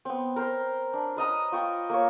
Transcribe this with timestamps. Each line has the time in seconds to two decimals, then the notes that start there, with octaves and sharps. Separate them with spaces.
0.05 B3 C4
0.36 A#4 C5
0.93 D4
1.17 B4 D#5 A#5 D#6
1.52 F4 G5 C#6
1.90 A#3 A#4 C#5